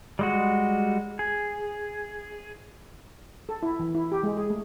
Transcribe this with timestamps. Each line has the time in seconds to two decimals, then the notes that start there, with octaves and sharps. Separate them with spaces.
0.19 G3 G#3 F#4
1.19 G#4
3.49 A4
3.63 E4
3.80 E3
3.95 E4
4.12 G4
4.23 G#3
4.37 G#4
4.50 A3